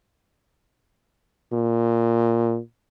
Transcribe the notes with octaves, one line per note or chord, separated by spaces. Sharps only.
A#2